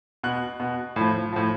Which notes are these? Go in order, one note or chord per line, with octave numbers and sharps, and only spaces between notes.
B2 F#6
B2
A2 F3
A2 F3